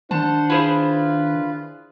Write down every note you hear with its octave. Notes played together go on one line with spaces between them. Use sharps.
D#3 D4 C5 F#5 A5
E4 F4 G#4 B4 C5